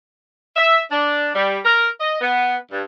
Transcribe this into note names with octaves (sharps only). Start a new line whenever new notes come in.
E5
D4
G3
A#4
D#5
B3
G2